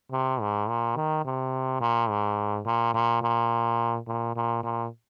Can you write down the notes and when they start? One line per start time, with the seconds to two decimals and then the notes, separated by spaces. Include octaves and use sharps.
0.12 C3
0.41 G#2
0.68 A#2
0.96 D#3
1.25 C3
1.81 A#2
2.09 G#2
2.66 A#2
2.94 A#2
3.22 A#2
4.07 A#2
4.36 A#2
4.63 A#2